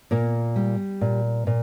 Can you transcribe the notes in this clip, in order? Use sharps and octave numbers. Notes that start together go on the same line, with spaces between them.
A#2 A#3
G3
A#2
A#2